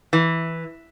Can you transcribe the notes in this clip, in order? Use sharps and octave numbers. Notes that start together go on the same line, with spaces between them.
E3